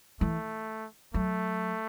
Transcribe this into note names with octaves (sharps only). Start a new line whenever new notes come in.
E3 A3
F#3 A3